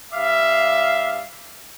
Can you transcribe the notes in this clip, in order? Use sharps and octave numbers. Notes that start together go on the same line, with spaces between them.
G2 D5 E5 F5